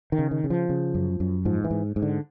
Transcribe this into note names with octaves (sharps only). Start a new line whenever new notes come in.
D#3
C#3
D#3
C#3
F3
C#3
F#2
F#2
G#2 F3
E3
G#2
G#2
D3